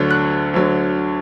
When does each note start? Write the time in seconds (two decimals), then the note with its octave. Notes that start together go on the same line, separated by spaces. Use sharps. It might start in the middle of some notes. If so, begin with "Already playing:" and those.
Already playing: D2 D3 F#3
0.11 F#6
0.54 D2 D3 F#3